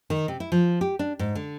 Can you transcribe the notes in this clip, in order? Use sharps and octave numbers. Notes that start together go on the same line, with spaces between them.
D#3
C3
E4
F3
G4
D4
G#2
D3